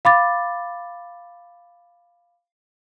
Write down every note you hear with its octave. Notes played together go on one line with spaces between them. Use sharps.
F5 B5 D6 A6